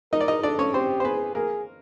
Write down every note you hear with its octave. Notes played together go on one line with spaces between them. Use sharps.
D#4 A#4 D#5
D5
D#4 D#5
D4 A4 D5
C#4 C#5
C4 G4 C5
C5
B3 G#4 B4
A#3 G#4 A#4